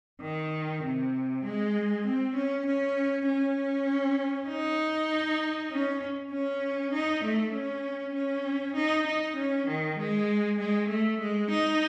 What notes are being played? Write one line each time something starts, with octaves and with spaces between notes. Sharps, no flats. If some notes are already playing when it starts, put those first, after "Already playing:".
D#3
C3
G#3
C4
C#4
C#4
C#4
D#4
C#4
C#4
D#4
A3
C#4
C#4
D#4
D#4
C#4
D#3
G#3
G#3
A3
G#3
D#4